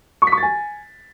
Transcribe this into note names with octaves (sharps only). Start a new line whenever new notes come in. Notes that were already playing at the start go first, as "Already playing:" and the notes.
C#6
B6
C#6
A6
G#5